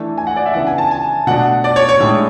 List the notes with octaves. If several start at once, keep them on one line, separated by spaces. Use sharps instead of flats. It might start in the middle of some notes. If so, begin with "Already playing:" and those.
Already playing: E3 A3 D4
G#5
F#5
D5
E5
C#3 E3 B3 D4 F#5
G#5
A5
G#5
B2 A3 D4 F#5
D5
C#5
C#5
A2 G#3 D4